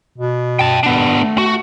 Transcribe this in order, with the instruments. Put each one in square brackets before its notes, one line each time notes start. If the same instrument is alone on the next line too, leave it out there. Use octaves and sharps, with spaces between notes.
[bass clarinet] B2
[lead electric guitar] G5 A5
B3 D4
[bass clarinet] A3
[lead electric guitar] F#4